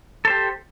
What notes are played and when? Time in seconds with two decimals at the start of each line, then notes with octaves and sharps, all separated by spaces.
0.25 A4
0.27 C5
0.30 G4